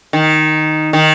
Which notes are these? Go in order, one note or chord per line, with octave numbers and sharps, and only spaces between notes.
D#3
D#3